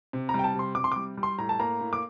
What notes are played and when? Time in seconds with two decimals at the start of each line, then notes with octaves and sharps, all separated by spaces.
0.13 C3
0.29 A#5
0.34 G3
0.39 G5
0.44 A5
0.55 C3 C6
0.75 C3 D6
0.84 C6
0.92 G3 D6
1.17 G3
1.23 C6
1.38 A2 A#5
1.49 A5
1.60 A#3 A#5
1.81 A2
1.93 D6